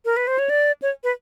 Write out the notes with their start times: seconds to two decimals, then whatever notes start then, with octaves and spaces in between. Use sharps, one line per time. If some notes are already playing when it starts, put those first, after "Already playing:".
0.05 A#4
0.17 B4
0.27 C5
0.39 C#5
0.50 D5
0.82 C#5
1.04 B4